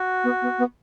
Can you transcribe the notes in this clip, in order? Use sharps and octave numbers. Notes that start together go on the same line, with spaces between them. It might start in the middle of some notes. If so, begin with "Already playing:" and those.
Already playing: F#4
B3
B3
B3